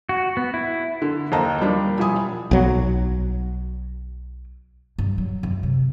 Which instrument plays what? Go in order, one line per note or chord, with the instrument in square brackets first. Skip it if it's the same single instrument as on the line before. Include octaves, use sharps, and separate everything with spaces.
[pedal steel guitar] F#4
B3
E4
[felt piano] D3
D#2 A4 C5 D#5 A5 A#5
F3 G3 A#3 D4
E1 F3 G3 E4 G#5 D#6
[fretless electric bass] B1 F#3
[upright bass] G2
F#3
F#2
C3